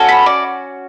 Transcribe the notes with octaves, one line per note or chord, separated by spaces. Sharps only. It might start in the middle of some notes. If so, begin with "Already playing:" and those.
Already playing: C#4 F#4 A4
B5
D5